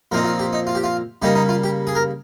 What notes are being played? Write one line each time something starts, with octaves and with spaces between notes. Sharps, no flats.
A#2 F3 C4 D#4 A#4
F4
G4
D#4
F4
G4
F4
C#3 G3 A#3 D#4 G4
D#4
F4
G4
G#4
A#4